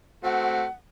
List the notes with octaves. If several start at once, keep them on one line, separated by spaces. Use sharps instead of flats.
A3 C4 F#4 F#5